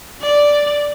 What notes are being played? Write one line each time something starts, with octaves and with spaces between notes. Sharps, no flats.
D5